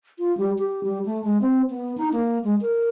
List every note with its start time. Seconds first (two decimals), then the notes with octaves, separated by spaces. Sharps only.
0.19 F4
0.38 G3
0.59 G4
0.84 G3
1.05 A3
1.24 G#3
1.41 C4
1.70 B3
1.98 D#4
2.13 A#3
2.44 G#3
2.61 A#4